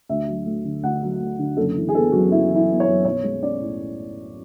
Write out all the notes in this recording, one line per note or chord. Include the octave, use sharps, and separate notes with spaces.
D2 E5
F#3
A3
D3
D2 F#5
F#3
A3
D3
F#1 A4
E3
G#4
B3 A4
F#2 F#4
F#1 E4
E3
E4
B3
C#5
F#2
B1 C#5
G#3
C#4 D5
A2